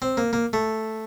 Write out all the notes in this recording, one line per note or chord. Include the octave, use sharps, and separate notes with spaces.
C4
A#3
A#3
A3